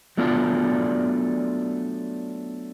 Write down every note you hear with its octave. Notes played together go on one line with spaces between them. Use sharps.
F#3 A3 B3 D4 F4 D5